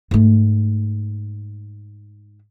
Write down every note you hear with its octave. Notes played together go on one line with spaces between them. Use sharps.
G#2 A3